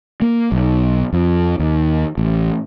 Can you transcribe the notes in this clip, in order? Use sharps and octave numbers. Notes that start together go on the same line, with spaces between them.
A#3
B1
F2
D#2
A1